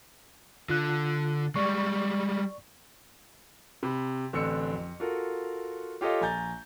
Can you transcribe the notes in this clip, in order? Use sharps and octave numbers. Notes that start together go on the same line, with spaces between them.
D3 F4 F#6
G3 G#3 D5 C#6
C3 B5
A1 D3 C4 E6 C#7
F2
F4 F#4 A4 A#4
F4 G4 A4 C#5 D#5 F5
A#1 G#5 A#5 G6 A6